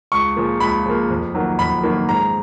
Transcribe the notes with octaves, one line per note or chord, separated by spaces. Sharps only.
C#2 C#6
C#3 F3 A#3
C#2 B5
C#3 F3 A#3
F2
D#3 F#3 A#3
F2 B5
D#3 F#3 A#3
G#2 A#5